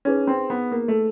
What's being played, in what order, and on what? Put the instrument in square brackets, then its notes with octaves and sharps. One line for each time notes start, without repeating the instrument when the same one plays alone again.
[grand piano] C#4 [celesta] D#4 G#4 B4
[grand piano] C4
B3
A#3
A3